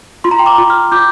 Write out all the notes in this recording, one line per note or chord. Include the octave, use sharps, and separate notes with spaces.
F4 C6
A#5
G5 C6
A#5 D6
F4
C6 F6
F4 D6 G6